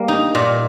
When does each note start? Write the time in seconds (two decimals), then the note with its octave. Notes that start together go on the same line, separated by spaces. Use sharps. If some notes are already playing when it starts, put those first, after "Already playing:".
Already playing: G3 A#3
0.08 D#4
0.35 A#2